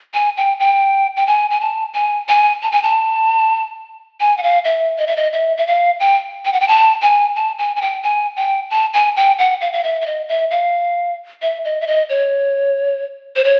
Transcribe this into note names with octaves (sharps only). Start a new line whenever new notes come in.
G#5
G5
G5
G5
G#5
G#5
A5
G#5
G#5
A5
G#5
A5
G#5
F#5
F5
E5
D#5
E5
D#5
E5
E5
F5
G5
G5
F#5
G5
A5
G#5
A5
G#5
G#5
G5
G#5
G5
A5
G#5
G5
F#5
F5
F5
E5
E5
D#5
E5
F5
E5
D#5
E5
D#5
C#5
C5
C#5